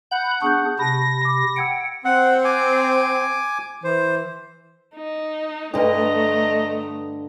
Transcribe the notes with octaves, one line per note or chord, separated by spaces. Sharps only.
F#5 B5 G6
B3 D4 G#4 C#6 G6
C3 A5 B5 A#6
B5 D6
F#5 G5 E6 G#6 C#7
C4 F#5
G#5 D6
E3 C5
D#4
G2 D3 A3 D4 B4 D#5 A#5